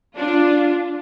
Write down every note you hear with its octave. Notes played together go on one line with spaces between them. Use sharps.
D4 F4